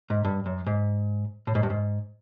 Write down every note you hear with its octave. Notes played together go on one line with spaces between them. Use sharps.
G#2
G2
F#2
G#2
A2
G#2
G2
G#2